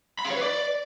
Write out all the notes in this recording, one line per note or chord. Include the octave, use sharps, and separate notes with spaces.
B5
F5
C#5
B4
D5